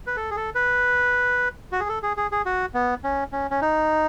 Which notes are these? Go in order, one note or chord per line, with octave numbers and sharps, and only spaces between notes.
B4
A4
G#4
A4
B4
F#4
G#4
A4
G#4
G#4
G#4
F#4
B3
C#4
C#4
C#4
D#4